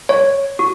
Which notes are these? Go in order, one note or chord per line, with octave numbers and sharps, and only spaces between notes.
C#5
F#4